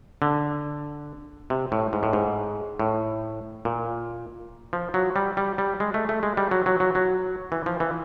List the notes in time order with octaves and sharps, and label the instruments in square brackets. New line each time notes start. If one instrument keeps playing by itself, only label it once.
[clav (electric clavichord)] D3
C3
A2
G#2
A2
G#2
A2
A#2
F3
F#3
G3
G3
G3
G#3
A3
A3
G#3
G3
F#3
F#3
F#3
F#3
E3
F3
E3